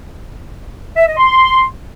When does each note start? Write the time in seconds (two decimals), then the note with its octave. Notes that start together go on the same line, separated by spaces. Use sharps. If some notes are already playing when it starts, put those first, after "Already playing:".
0.96 E5
1.07 D#5
1.17 C6